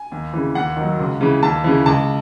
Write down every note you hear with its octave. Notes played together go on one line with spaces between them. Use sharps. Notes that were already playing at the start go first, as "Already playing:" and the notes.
Already playing: G#5
D#2
C#3 E3
D#2 F#5
D#3
F#3
C#2
C#3 E3
D#2 A5
C#3 E3
C#2 A5